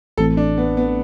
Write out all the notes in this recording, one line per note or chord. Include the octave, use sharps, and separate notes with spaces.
A1 A2 E3 A3 C4 A4
D4
B3
B3